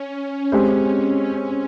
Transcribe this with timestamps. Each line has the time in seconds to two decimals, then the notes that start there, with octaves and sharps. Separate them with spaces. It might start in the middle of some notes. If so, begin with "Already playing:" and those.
Already playing: C#4
0.52 G#3 C4 G4 C5